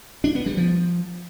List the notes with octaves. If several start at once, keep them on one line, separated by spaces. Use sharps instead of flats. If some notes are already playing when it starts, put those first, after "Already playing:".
D4
B3
G3
F3